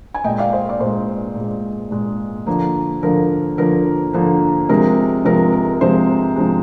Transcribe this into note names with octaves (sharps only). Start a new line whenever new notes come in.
G#5
A#2 G#3 D#5 G5
D5 F5
C5 D#5
D5
A#2 G#3 C5
A#2 G#3
A#2 G#3
D3 F3 A#3
D3 F3 A#3 A#4
D3 F3 A#3 A#4
D3 F3 A#3
C3 F3 G#3 A#4
C3 F3 G#3 A#4
A#4
C3 F3 G#3 C5
C3 F3 G#3